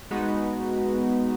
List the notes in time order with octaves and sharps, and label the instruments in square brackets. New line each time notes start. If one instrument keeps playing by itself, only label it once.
[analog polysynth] G#3 B3 D#4 F#4 B4